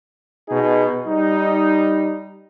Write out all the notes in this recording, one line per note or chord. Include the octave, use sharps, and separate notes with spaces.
B2 D#4 G#4
G3 D#4